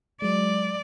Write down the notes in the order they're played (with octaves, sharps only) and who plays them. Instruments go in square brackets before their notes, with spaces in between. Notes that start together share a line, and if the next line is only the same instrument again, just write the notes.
[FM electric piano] F#3 G#3 [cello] D5